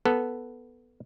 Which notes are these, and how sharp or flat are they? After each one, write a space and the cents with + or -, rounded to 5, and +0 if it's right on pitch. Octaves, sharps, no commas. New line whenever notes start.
B3 +0 A4 +0